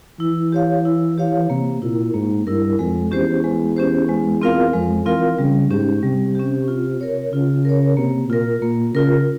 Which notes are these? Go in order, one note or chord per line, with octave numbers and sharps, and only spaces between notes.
E3 E4
G4 C#5 F5
E4
G4 C#5 F5
C3 A#3
A#2 E4 A#4
G#2 A#3
G2 E4 A#4
F2 G#3
E2 C#4 G4 C5
G#3
C#4 G4 C5
G#3
C4 F4 A#4 F5
F2 G#3
E3 C4 F4 A#4 F5
C#3 G3
G#2 C#4 G4
C3 G3
C#4 G4
F4
A#4 C#5
C#3 F4
A#4 C#5
C3 A#3
A#2 F4 A#4
A#2 A#3
C#3 F4 A#4